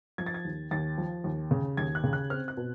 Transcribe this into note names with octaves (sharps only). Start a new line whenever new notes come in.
F3 G#6
A6
G#6
D#2
D#2 A6
F3
D#2
C#3
D#2 G#6
F#6
C#3
F#6
C4 F6
F#6
B2